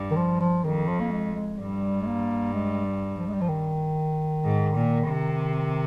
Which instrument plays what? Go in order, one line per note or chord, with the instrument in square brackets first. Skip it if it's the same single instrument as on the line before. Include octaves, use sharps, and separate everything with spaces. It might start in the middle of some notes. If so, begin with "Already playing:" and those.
Already playing: [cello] G2
[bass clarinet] D#3
F3
F3
[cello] F2 [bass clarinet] D#3
[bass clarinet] F3
A#3
G#3
G#3
[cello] G2 [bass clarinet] G3
[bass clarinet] G#3
A#3
G#3
G3
F3
G#3
G3
F3
D#3
[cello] G#2
A#2
C3